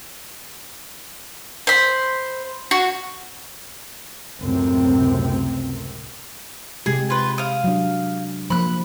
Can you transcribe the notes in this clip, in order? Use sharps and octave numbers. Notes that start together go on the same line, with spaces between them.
C5 B5
F#4
C#2 F#2 A2 C3 C4
C3 G#3 G4 G#4
F4 B4
F5 D#6
F#3 D4
F3 A#3 B5 F#6